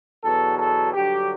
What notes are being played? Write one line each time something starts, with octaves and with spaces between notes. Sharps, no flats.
E2 B2 F#3 A4
A4
G2 D3 F#3 G4